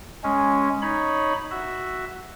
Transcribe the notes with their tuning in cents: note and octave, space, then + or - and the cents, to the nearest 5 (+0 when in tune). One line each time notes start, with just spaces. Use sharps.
G#3 +0 C#4 +0
D#4 +0 C#5 +0 B5 +0
F#4 +0 E5 +0